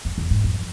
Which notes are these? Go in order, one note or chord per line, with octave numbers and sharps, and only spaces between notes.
F2
E2
G#2
F2